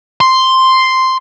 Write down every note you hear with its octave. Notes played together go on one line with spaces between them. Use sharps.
C6